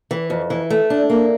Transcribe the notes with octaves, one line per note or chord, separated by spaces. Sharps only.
E3
F2
E3
A3
D4
A#3